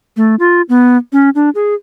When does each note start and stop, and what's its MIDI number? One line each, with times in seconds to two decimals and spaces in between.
0.17 0.35 57
0.39 0.62 65
0.69 0.97 59
1.13 1.30 61
1.35 1.50 62
1.55 1.74 68